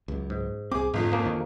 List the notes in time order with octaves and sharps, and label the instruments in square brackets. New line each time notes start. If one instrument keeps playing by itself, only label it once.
[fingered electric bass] C#2 F#2
[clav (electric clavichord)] G#2
[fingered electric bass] C2 C4 [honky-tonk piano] G#4 D6
[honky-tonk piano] G1 F2 [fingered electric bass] G#2
[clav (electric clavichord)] F3 A#3 C#4
[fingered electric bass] F2 D#3